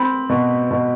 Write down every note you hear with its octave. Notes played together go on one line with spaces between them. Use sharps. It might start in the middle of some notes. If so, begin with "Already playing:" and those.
Already playing: C4 B5
B2
B2